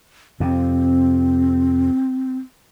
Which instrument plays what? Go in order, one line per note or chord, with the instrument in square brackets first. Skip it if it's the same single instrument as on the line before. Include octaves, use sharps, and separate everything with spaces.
[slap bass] F2 C3 [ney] C4